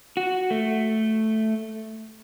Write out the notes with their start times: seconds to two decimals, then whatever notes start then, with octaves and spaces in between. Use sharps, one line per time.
0.17 F#4
0.51 A3